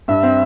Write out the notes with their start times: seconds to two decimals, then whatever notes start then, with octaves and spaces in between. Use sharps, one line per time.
0.08 G2 E5
0.23 C4